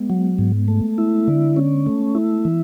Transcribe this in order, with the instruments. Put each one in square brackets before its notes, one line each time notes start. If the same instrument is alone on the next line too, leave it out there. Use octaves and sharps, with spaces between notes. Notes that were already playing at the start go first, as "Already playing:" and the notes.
Already playing: [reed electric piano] G#3 B3
[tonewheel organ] F#3
G#2
A3
E4
D3
C#4
A3
E4
E3